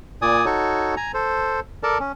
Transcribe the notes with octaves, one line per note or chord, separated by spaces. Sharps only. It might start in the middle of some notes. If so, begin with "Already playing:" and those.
A#2 D5 G#5 D#6
D#4 F#4 A4 C#5
G#5 A#5
A4 C5
A4 A#4 D5 A5
C#4